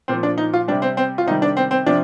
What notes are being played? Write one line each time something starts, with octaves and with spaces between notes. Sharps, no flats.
A#2 F3 C4
D4
D#4
F4
C3 G3 D4
C4
C4
F4
C3 D#3 G3 D#4
D4
C4
C4
C3 F3 D4